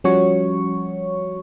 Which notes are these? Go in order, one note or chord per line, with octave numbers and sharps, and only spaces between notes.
F3 G3 C#4 F#4 C#5 C#6